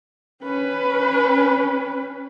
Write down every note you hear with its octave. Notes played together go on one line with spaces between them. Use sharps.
C#4 B4